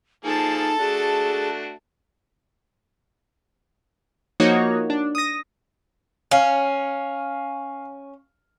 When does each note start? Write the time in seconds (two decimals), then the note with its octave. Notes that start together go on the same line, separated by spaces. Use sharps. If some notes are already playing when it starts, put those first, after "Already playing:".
0.24 F3 A#3 D#4 G#4 A4 A5
0.80 A3 D4 F#4 G#4
4.40 F3 A#3 D#4 F#4 C#5
4.90 D4
5.15 D#6 A#6
6.31 C#4 F5